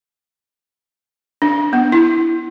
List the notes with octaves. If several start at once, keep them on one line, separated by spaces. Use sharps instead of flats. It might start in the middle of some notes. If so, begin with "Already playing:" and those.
D4
B3
E4